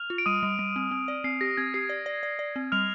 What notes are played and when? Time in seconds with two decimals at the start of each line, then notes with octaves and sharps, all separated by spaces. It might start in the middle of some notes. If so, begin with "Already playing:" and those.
Already playing: F6 F7
0.10 F4
0.18 D7
0.26 G3 D#6 D#7
0.43 G3
0.59 G3
0.76 C4
0.91 C4
1.08 D5
1.24 C4 C7
1.41 G4 A#6
1.57 C4 G#6
1.74 G4 C7
1.89 D5
2.06 D5
2.23 D5
2.39 D5
2.56 C4
2.72 G3 F6 F7